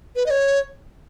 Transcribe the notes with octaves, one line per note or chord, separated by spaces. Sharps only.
B4
D#5
C#5